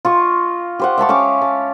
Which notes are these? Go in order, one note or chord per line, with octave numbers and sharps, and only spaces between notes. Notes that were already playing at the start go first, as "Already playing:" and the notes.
F4 D#5 C#6
G4 C5 F#5
E5 F5 A5 C#6
C#4 C#5 G#5 D6
A5